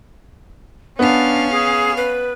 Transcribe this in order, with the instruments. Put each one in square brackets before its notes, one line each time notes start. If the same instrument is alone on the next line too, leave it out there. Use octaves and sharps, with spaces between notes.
[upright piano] B3 [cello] C#4 F5 [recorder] D4
[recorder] G#4
B4